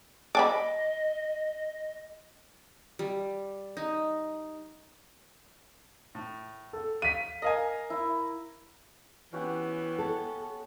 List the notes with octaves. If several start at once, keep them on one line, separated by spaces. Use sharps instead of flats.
D5 D#5 G#5 B5
G3
D#4
A2
A4
F5 B6 D#7
A#4 D#5 F5 G#5
E4
E3 B3 C#4 F#4 G4
A4